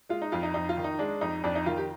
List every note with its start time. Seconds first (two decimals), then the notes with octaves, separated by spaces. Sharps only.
0.09 G#3 F4
0.22 D#4
0.32 F2 F4
0.43 D#4
0.54 F2 D#4
0.69 F4
0.77 D#3
0.84 D#4
0.99 G#3 D4
1.21 F2 D#4
1.44 F2 D4
1.55 D#4
1.66 D#3 F4
1.77 G4